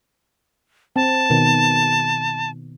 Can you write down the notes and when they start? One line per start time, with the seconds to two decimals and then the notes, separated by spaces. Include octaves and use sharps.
0.96 C4 A5
1.30 B2 D#3